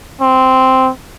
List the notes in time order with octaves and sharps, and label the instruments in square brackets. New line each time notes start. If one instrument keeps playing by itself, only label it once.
[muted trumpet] C4